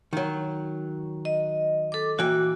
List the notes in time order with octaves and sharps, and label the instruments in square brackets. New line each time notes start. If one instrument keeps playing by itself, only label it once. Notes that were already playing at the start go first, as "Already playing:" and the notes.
[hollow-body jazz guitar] D#3 F#3
[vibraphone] D#5
A4 D6
[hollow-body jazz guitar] A#2 E3 G5 [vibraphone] F#4